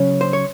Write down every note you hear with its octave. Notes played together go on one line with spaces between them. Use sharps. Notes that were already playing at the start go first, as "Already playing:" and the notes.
Already playing: C#3 F#3 C#4
C5
C#5